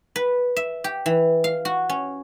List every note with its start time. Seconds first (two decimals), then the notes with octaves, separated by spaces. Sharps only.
0.16 B4
0.56 E5
0.84 G4
1.06 E3
1.44 F5
1.65 F#4
1.89 C#4